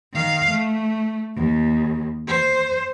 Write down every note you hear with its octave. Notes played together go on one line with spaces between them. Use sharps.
D#3 F5
A3
D#2
C5